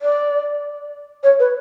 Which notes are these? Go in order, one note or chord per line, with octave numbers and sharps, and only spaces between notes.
D5
C#5
B4